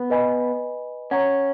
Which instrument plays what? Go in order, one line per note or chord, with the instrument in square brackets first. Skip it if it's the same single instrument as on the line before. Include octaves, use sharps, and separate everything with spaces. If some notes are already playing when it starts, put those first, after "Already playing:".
Already playing: [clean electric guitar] B3
[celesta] B4 D#5 G#5 B5
[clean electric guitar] C#4 [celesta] C#5 F#5 A#5 C#6